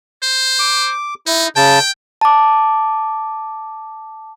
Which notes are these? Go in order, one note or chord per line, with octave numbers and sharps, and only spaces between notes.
C5
D6
D#4 E4
C#3 G5 A5
A5 D6